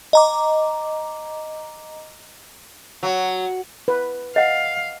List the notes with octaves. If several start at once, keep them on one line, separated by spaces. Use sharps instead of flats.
D#5 A#5 D6
F#3
B4
D#5 F5 F#5